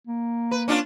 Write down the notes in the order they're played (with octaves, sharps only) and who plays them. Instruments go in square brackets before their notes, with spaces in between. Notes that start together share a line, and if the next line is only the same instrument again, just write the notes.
[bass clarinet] A#3
[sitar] B4
C#4 D4 F4